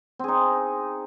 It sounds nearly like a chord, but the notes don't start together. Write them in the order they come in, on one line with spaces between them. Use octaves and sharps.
C4 G#4 D#4